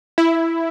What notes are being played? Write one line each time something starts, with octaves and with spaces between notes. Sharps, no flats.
E4